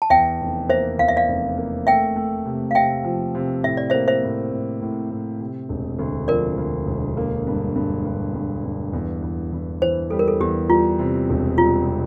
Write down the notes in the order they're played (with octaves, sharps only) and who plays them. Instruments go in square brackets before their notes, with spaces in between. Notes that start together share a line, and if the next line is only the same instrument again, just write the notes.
[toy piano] A5
[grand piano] E2 [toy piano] E5 G5
[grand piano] F1
[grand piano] A#3 [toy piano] C5 E5
[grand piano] E2 [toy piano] F5
[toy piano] E5
D5 F5
[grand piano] F1
A#3
[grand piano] A3 [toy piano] E5 G5
[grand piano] A3
C3
[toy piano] F5
[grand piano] C3 [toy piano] E5 G5
[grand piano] F3
C3
[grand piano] A2 [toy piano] E5
[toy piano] D5
C5 E5
[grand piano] A#3
[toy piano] C5 E5
[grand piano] A2
A2
A2
A2
C3
E1
D2
[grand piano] F3 [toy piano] A#4 D5
[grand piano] D2
E1
A#3
G2
G2
G2
G2
G2
E2
E2
E2
[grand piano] E3 [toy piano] C5
[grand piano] G3 [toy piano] A4
[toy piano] A#4
A4
[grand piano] E2 [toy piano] G4
[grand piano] G3 [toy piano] F4
[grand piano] C3
E1
[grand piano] G3 [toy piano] F4
[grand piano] C3